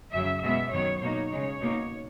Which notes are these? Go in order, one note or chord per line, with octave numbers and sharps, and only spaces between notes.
F#2 C#3 F#3 E5
B2 G#3 B3 E5
F#2 D#3 F#3 B3 C#5
B2 A#3 D#4 C#5
C#3 G#3 D#4
B2 A#3 D#4